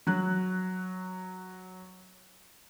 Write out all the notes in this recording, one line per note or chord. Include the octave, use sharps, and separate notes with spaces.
F#3 F#6